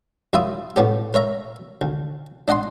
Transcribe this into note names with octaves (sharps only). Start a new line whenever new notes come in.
F#2 E4 F4 E5 D#6
A2 B3 C#4 G4
A#4 C#5 E5 A#5
D2
D4 D#5 F#5 G#5 C6